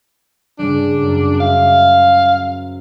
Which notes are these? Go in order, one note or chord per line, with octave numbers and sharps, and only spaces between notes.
G2 C#3 G3 D4
F#2
C5 E5 F5